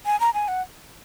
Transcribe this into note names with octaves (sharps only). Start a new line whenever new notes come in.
G#5
A#5
G#5
F#5